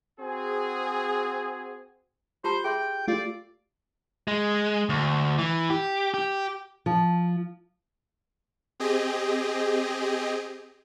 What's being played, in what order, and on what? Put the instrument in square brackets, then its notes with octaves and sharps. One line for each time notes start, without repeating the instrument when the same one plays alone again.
[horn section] C4 F#4 G#4
[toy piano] F4 G4 A5 [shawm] C5
[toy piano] G#4 E5 C6 [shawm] G5
[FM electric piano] A3 F4 G4 [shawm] D5
[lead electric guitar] G#3
D2
E3
G4
G4
[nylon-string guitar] F3
[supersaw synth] C4 G4 G#4 D#5